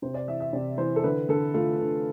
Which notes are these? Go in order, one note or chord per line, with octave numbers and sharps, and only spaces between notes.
C3 C5
D5
E3 E5
E5
C3 D5
E3 C5
A4
D3 B4
D3 A4
A3 F4
D3